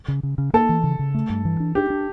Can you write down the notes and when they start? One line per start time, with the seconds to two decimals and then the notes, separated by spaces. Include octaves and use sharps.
0.08 C#3
0.23 C#3
0.38 C#3
0.54 A#3 A4
0.69 E3
0.84 C#3
0.99 C#3
1.14 A3
1.30 G2
1.45 E3
1.60 D4
1.75 D4 G4
1.90 D4